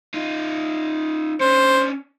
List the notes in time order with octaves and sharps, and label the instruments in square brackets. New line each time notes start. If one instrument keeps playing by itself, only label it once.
[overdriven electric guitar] D#4 F4
[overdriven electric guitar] C#4 D4 [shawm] C5